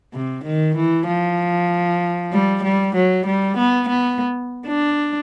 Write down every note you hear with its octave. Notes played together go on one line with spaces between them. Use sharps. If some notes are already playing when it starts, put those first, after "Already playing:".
C3
D#3
E3
F3
G3
G3
F#3
G3
B3
B3
D4